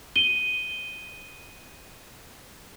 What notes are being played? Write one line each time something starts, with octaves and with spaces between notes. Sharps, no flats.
D#7 G7